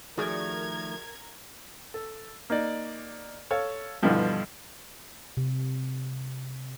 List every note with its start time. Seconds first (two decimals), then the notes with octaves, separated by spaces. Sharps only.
0.18 D#3 F3 A3 F#4 G#4 A#4 D5 G#6
1.94 A4
2.50 A#3 D#4 D5
3.51 A4 C#5 F5
4.02 G2 B2 D3 E3 F3 G3
5.37 C3